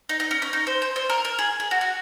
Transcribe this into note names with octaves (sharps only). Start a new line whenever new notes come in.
D#4
D#4
C#4
C#4
D#4
C5
C5
C5
A#4
A#4
G#4
G#4
F#4
F#4